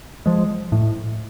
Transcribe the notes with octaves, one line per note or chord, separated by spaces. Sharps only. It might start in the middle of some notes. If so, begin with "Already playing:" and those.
F3 G#3
A2